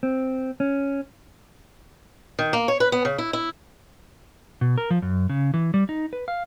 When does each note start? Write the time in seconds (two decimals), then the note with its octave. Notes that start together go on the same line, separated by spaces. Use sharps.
0.03 C4
0.60 C#4
2.39 D#3
2.53 A#3
2.68 C#5
2.80 B4
2.92 B3
3.05 C#3
3.18 E4
3.33 E4
4.61 B2
4.78 A#4
4.91 F3
5.02 F#2
5.30 C#3
5.54 E3
5.74 G3
5.89 D#4
6.13 B4
6.28 F5